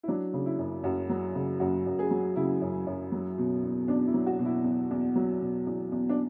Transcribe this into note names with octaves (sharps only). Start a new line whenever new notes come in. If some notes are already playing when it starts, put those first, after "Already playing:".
E4
F#3 D4
C#3
E4
F#2
F#2 F#4
F#3
C#3
F#2 F#4
F#2
G#4
F#3
C#3 E4
F#2
F#2
F#3
B2
E2
E2 D4
E4
F#3
F#4
B2
E4
E2
E2
F#3
B2
E2
E2
D4